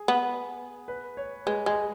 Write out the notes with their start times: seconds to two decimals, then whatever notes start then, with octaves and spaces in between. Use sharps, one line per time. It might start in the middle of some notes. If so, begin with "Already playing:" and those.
Already playing: G#4
0.08 B3
0.88 B4
1.17 C#5
1.46 G#3 B4
1.66 G#3 G#4